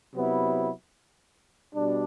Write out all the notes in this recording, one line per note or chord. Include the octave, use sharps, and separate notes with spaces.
C3 F#3 B3 E4
B2 G3 D4